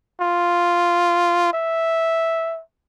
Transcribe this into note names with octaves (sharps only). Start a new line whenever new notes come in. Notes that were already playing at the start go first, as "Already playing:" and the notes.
F4
E5